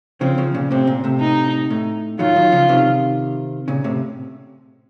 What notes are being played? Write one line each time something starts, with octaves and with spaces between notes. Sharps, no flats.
C#3 F3 C4
C#3 F3
A#2 C#3
A2 C3 C4
A#2
A2 C3
D#4
A2
D#3 F#3 F4
D#3 F#3
C#3 F3
C3 D#3
A#2 C#3
A2 C3